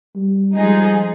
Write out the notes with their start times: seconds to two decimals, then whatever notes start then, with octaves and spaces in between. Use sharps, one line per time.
0.15 G3
0.56 F3 G3 G#3 D#4 G#4